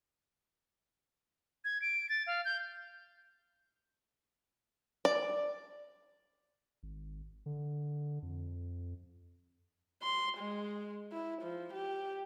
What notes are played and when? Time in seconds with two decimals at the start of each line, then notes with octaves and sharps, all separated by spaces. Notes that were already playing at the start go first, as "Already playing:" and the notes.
1.65 G#6
1.82 D7
2.09 A6
2.27 F5
2.45 G6
5.05 D5
6.83 G#1
7.46 D3
8.22 F2
10.03 C6
10.38 G#3
11.12 E4
11.42 F3
11.73 G4